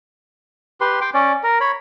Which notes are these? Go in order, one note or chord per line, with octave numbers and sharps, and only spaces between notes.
G4 B4 C6
G5 C6 D6
C#4 D5
A#4
C#5 B5